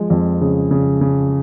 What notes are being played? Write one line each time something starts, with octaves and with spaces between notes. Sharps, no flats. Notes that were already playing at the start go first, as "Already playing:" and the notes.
Already playing: F3 G#3
F2
C#3
C#3
C#3